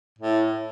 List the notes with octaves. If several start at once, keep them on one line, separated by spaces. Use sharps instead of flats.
A2